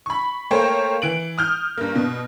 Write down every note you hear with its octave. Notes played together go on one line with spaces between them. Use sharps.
B5 C#6
A3 A#3 C5 C#5 G5
E3 D7 F#7
D#6 F6 G6
G2 A#3
B2